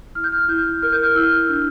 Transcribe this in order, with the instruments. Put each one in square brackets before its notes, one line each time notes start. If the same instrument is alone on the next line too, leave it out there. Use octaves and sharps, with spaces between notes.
[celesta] E4 F6
G6
F6
E4 G6
A#4 F6
G6
F6
E4 E6
D4